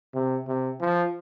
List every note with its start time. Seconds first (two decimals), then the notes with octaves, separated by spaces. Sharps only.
0.14 C3
0.47 C3
0.80 F3